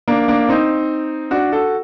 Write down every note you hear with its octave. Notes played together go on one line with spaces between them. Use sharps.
A#3 D4
A#3 D4
C4 D#4
D4 F#4
F#4 A4